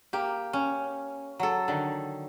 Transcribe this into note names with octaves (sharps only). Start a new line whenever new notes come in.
A#3 G4
C#4
F#3 A4
D3 D#3